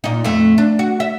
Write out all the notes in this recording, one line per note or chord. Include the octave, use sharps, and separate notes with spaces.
A#2 D#4
F2 A3
D4
F#4
E5